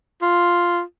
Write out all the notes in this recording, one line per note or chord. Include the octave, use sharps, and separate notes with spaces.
F4